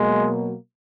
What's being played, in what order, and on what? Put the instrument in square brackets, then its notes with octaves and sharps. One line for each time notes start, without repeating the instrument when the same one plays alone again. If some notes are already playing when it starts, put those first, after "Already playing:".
Already playing: [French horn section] B2 F#3 A#3 [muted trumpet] G#3